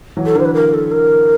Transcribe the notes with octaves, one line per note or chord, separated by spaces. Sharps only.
E3 F#3
A4
D3 E3 A#4 C5
B4
A#4
A4
A#4